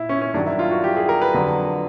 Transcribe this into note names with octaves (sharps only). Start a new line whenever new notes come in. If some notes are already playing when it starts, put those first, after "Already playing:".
Already playing: A#2 E4
C#4
C#4
G2 D#3 F#3 D4
E4
F4
F#4
G4
G#4
A#4
B4
F2 D3 F#3